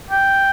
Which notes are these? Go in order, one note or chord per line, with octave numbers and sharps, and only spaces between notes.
G5